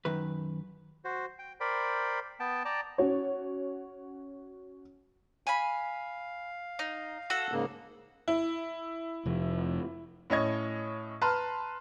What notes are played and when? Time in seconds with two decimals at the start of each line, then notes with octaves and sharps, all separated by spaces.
0.05 F#2 D#3 B4
1.05 F#4 C5
1.39 G5
1.60 A#4 C5 D5 G5 B5
2.40 B3 G5 A5
2.65 D5 G5 A5 A#5
2.98 C#4 F#4 C#5
5.47 F5 G#5 B5
6.79 D#4
7.30 F#4 A4 F#5
7.52 G#2 C#3 A#3
8.28 E4
9.26 F1 F3
10.30 A2 C#4 D#5 G#6
11.22 B4 A5 A#5 C6 F6